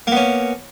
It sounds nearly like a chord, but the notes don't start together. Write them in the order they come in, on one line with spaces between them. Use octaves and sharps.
A#3 B3 C#4